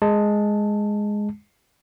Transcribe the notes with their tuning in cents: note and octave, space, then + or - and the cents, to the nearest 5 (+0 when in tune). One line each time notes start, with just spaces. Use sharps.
G#3 +0 A5 +0